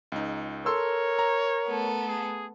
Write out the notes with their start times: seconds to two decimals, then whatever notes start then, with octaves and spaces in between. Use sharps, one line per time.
0.12 C#2 D#4
0.66 A4 A#4 C#5 C6 E6
1.19 A#5
1.67 A3 B3 A4
2.08 G#4